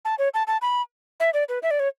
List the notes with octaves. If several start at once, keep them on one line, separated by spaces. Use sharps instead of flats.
A5
C#5
A5
A5
B5
E5
D5
B4
E5
D5
C#5